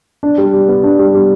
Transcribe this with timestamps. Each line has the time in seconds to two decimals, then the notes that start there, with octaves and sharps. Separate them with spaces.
0.23 D4
0.38 G3
0.53 G3
0.68 B3
0.83 D4
0.99 G3
1.14 G3